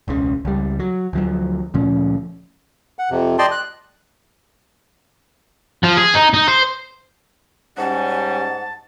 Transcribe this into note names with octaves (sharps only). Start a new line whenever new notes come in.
E1 C#2 C#3
C#2 G3
F#3
D2 F3 F#3
D2 A#2 F3 C#4
F#5
F2 C3
D5 D#5 G5 A5 C6
F#6
F3
G#4
D#4
D#4
C5
G#2 G3 C#4 F#5 A5